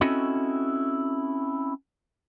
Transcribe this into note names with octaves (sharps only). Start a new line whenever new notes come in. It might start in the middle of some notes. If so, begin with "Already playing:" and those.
C4 C#4 E4 F#4 A4 D#5